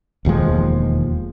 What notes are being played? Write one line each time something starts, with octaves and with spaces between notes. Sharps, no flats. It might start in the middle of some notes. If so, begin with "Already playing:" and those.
E1 D#2 F3 G#3